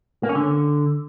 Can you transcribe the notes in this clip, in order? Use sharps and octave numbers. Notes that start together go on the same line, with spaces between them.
A#3
C#4
D3